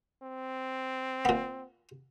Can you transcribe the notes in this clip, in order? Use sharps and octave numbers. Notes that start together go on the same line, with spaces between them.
C4
A#2 B3